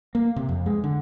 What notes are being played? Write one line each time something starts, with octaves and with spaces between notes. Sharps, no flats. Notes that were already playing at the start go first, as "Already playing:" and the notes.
A#3
C3
F2
G#3
D3